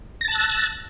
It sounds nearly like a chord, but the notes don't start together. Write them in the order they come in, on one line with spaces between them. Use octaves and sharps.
A#6 A6 A5 F#6 E6